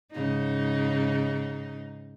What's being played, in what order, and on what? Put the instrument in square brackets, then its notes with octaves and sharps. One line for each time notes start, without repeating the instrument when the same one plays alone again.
[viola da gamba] G#2 C#3 D#4